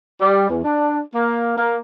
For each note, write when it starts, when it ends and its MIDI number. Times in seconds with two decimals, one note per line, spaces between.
0.21 0.46 55
0.50 0.62 40
0.65 1.01 62
1.15 1.54 58
1.57 1.77 58